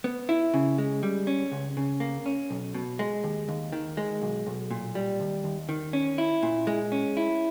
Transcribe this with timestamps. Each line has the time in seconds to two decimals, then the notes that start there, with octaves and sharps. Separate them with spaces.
0.04 B3
0.29 E4
0.54 C#3
0.78 G#3
1.03 G3
1.27 C#4
1.52 C#2
1.77 C#3
2.00 A#3
2.26 C#4
2.50 B1
2.74 B2
2.99 G#3
3.24 D#2
3.48 D#2
3.72 D#3
3.97 G#3
4.22 B1
4.46 B1
4.71 A#2
4.95 G3
5.20 D#2
5.44 D#2
5.69 D#3
5.93 C#4
6.18 E4
6.43 A#2
6.67 G#3
6.92 C#4
7.17 E4